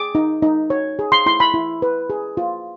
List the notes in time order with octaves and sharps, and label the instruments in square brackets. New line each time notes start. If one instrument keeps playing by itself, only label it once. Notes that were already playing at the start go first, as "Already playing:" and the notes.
Already playing: [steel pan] G#4 D6
D#4
D#4
C#5
G#4
C6
E4 C6
B5
E4
B4
G#4
F4